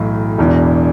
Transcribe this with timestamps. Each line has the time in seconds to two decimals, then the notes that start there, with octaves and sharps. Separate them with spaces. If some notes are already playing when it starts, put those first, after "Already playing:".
Already playing: B1 A2 E3
0.38 E1 E2 E3